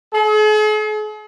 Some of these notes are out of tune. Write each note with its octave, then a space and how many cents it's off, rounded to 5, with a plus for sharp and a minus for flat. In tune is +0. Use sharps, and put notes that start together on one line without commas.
G#4 +45